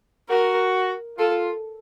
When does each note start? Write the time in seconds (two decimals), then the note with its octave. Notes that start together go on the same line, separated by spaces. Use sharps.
0.29 F#4 A#4
1.18 F4 A4